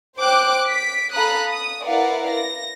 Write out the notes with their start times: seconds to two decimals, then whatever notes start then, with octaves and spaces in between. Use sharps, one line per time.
0.18 C5 G5 D6 F#6
0.67 B6 D7
1.13 A4 F5 A#5 B5 D#6 F#6
1.46 D#6
1.85 E4 A#4 B4 D5 F5 F#5
2.29 A#6